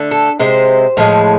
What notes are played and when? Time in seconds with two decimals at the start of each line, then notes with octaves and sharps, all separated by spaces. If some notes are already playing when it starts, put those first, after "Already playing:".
Already playing: D3 A3
0.11 A4
0.39 C3 G#3 C5
0.97 A2 F3 G#3